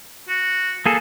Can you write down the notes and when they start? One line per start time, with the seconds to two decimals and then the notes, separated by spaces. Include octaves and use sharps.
0.28 F#4
0.86 A#3 G#4 A4 A5